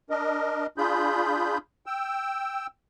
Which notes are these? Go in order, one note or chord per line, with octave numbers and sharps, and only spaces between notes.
D4 A#4 D#5
D4 F4 G#4 B5 G6
G5 E6